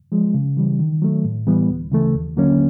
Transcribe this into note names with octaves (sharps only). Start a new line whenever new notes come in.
F3 G#3
C#3
E3 G3
D#3
F#3 A3
A2
E3 G3 B3
D2
C#3 E3 A3
D#2
D3 F#3 A#3 C#4